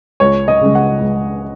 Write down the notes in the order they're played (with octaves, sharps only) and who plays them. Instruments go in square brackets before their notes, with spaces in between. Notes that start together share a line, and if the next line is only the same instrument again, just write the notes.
[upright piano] C#2 C#5
D#5
C#3 G#3
F#5
C#2